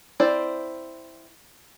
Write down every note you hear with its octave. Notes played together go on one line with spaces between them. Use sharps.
C4 E4 C5 D5